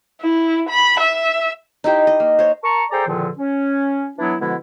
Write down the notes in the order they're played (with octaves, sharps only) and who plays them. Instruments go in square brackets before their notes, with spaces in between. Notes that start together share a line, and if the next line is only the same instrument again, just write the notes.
[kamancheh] E4
B5
E5
[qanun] D#4 E4 G4 C5
D#5
A#3
C5 C#5
[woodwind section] A#4 A5 A#5 C#6
G#4 A4 C5 D5 G5 A#5
E2 A#2 D3 D#3 F3
C#4
E3 F#3 B3 D4 E4
B2 D3 F3 G#3 B3 E4